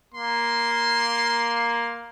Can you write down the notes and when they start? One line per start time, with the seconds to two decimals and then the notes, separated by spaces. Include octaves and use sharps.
0.14 A#3 C6